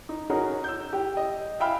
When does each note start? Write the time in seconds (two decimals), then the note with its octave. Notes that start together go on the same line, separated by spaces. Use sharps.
0.09 D#4
0.30 C#4 D#4 F#4 G#4 A#4
0.64 E6 G6
0.93 G4 G5
1.17 D#5
1.60 E5 F5 G5 G#5 B5 F6